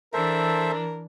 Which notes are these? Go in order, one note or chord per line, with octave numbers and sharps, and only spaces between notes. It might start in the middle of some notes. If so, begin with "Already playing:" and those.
E3 D4 A4 A#4 C5 E5